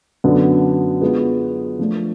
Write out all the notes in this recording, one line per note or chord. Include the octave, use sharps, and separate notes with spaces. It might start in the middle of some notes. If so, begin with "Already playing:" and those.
F#2 D3 F#3 B3 D4
G#3 B3 D4 F4
F3 A3 D4